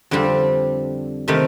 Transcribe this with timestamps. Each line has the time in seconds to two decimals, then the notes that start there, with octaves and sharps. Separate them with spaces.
0.11 F2 D3 G3 C4
1.28 C3 D#3 A3 D#4